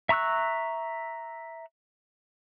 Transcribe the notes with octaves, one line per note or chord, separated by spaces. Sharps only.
E5 A#5 C#6 E6 F#6